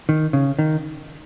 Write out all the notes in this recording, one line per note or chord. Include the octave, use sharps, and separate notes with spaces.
D#3
C#3
D#3